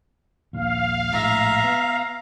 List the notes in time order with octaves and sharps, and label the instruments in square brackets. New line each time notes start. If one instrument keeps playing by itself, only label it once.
[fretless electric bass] A#1 D#2 [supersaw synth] F5
[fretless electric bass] A#1 A2 G#3 [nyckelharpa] E5 A#5
[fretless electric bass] B3